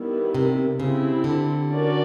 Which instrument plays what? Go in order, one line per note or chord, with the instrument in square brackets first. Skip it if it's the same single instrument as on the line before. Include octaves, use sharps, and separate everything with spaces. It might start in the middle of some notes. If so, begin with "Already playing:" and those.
Already playing: [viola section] D#3 G3 B3 E4
[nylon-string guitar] C3
[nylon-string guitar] C#3 [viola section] C4 E4 G4
[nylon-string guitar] D3
[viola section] C#4 F#4 A#4 D5